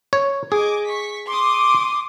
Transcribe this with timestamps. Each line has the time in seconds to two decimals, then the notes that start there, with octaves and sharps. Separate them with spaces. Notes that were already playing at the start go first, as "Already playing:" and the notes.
0.13 C#5
0.52 G#4 D#5 D6 G#6
0.86 C#6 B6
1.28 C6 D6 D#6